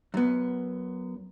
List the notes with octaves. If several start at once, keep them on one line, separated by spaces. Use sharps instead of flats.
F#2 B3